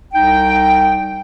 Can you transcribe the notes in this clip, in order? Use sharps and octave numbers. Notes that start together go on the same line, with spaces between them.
C2 D#4 G5